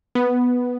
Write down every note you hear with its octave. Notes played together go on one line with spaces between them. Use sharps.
B3